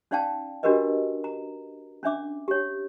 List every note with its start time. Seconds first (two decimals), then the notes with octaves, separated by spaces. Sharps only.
0.11 C#4 D#4 D5 F5 G5 A5
0.63 D4 F#4 G4 A#4 B4 D#5
1.24 A#5
2.03 C#4 D4 E5 D6
2.48 G4 C#5